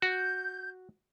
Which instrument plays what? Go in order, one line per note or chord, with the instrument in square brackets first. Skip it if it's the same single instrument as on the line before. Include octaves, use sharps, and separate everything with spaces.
[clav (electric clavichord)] F#4 [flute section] G6